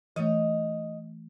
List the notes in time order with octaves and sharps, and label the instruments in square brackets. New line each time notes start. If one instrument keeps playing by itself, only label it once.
[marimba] E3 A3 [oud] D#4 C#5 D#5